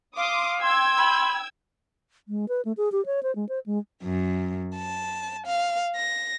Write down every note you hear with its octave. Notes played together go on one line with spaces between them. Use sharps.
F5 C6 D6 D#6
G5 C6 E6 G#6
B5
G#3
B4
A3
G#4
G4
C#5
C5
G#3
C5
G#3
F#2
A5
F5
A#6